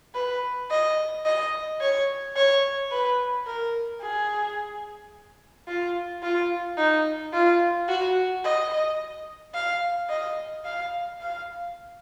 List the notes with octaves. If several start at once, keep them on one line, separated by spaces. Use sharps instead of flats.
B4
D#5
D#5
C#5
C#5
B4
A#4
G#4
F4
F4
D#4
F4
F#4
D#5
F5
D#5
F5
F5